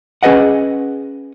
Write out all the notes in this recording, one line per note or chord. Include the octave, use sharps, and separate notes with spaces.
C#4 G#4 B4 D#5 F#5